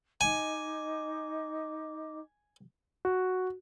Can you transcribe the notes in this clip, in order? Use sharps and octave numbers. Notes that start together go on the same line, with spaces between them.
D#4 D#5 G#5 D6
F#4